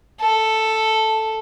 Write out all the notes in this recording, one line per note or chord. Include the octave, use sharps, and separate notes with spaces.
A4